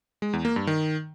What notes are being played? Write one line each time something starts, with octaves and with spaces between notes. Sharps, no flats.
G#3
E2
A#3
G2
D#3